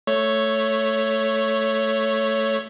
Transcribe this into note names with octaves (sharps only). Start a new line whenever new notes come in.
A3 C#5